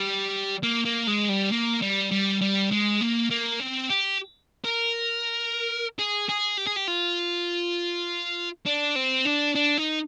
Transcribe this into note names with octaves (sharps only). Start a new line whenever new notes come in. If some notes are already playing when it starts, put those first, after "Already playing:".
Already playing: G3
A#3
A#3
G#3
G3
A#3
G3
G3
G3
G#3
A#3
A#3
C4
G4
A#4
G#4
G#4
G4
G#4
G4
F4
D4
C4
D4
D4
D#4